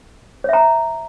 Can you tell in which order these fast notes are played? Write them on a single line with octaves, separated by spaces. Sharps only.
C#5 E5 A#5